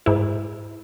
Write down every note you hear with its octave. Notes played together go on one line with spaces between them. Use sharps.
G#2 E4